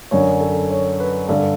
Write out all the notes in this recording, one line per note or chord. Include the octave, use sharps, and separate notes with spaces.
F#2 D3 C#5
A4
C#5
B4
G2 D3 A4